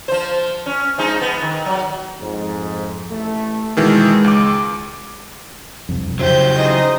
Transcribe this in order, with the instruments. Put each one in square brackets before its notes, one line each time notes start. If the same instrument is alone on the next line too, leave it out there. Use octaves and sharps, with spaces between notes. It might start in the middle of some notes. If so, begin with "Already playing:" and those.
[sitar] F3 C5
C#4
F3 G#3 D#4
B3
D#3
F#3
[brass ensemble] F2 G#2
A1 A3
[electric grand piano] B2 D#3 E3 [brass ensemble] G#3
[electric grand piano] C#2 D6
[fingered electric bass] E1 C2 F2
[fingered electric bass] C#3 [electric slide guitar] F#3 E4 G4 [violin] C5 G6
[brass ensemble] D#4 G#4 C5 [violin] D#5